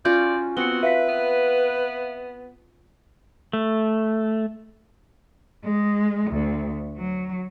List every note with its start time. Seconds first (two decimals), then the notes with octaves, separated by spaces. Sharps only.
0.05 C#4 F4 F#4 D5 G6
0.57 B3 C4 F#4 C#7 G7
0.83 B4 E5 F5 B6
1.09 B3
3.53 A3
5.64 G#3
6.30 D2
6.97 F#3